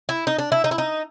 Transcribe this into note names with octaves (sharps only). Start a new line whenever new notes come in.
E4
D#4
D4
E4
D#4
E4
D#4